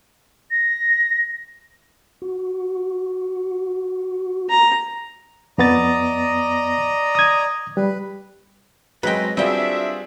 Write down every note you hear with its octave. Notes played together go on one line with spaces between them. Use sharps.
A#6
F#4
A#5
F2 B3 D5 D#5 A#5 A6
D#6 G#6
G3 B4
F#3 G#3 C4 B4 D#5 G5
G3 C4 D4 F4 F#4 G#4 E5 G5